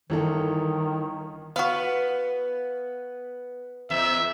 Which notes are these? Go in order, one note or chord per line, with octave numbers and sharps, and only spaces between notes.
G1 D#3 E3 A4
B3 F#4 F5
E2 E5